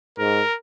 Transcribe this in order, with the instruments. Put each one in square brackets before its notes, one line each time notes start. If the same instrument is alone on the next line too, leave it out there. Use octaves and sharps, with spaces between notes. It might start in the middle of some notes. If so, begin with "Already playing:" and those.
[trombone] G#2 [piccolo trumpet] A#4